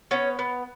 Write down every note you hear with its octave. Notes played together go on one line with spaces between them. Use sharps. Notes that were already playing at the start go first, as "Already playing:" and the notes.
B3 C#4
B3